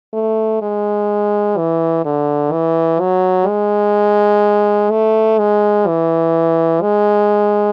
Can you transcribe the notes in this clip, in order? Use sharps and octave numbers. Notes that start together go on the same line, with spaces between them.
A3
G#3
E3
D3
E3
F#3
G#3
A3
G#3
E3
G#3